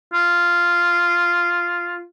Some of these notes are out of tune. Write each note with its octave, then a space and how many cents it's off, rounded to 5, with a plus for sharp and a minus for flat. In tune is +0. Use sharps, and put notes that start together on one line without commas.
F4 -5